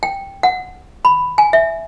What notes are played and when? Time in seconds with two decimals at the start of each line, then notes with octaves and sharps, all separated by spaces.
0.03 G5
0.43 F#5
1.05 B5
1.38 G#5
1.53 E5